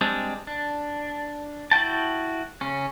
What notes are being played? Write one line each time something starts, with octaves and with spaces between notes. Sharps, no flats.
G3 G#3 C4 D4
D4
E4 F#4 G5 A5
C#3 C#4